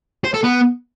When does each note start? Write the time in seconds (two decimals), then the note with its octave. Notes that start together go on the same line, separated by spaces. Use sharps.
0.24 C5
0.34 A4
0.43 B3